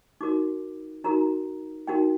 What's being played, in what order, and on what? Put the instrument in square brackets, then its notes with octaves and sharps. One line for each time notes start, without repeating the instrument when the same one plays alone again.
[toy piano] D#4 F#4 A#4 D6
D#4 F#4 A#4 A#5
D#4 F#4 A#4 G5